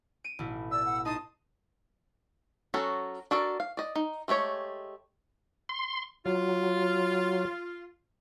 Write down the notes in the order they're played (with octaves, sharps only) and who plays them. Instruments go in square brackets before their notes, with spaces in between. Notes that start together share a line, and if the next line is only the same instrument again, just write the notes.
[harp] D7 D#7
A1 B2 E4
[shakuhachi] D5 [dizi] E6
[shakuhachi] F#5
[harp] D#4 D#5 C6 [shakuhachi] A5 [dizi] D#6
[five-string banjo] F#3 C#4 F#4 A4
D4 F#4 A4 A#4
F5
D5 D#5
D#4
G#3 A3 G4 C#5
[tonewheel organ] C6
[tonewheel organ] F#3 [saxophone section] F4